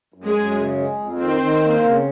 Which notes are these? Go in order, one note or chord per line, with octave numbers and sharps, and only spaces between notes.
F#2
G#3 G#4
F#2
C#3
G#3
F2
D#3 C4 C5
D#3
A#3
C#3